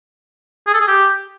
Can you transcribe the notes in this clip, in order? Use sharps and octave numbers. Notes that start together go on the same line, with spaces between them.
G#4
A4
G#4
G4